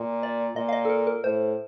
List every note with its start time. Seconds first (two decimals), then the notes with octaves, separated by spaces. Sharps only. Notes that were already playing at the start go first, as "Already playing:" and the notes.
Already playing: A#2
0.23 D5
0.56 A#2 D#5
0.69 F5
0.73 D#5
0.85 A4
0.90 A#4
1.07 A#4
1.24 A2 C5